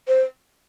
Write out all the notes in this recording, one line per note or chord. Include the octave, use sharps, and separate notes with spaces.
C5